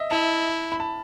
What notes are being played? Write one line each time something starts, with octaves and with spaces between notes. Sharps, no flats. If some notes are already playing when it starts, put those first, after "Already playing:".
Already playing: D#5 E5
E4 A5
B5
A5